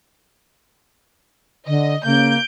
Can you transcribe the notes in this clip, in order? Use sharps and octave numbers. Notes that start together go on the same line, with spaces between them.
D3 D#5
C#3 A#3 G6 D7